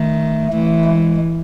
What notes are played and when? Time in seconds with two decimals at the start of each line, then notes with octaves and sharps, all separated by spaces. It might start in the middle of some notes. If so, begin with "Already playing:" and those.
Already playing: D#3 A3
0.52 E3 A3
0.84 G#3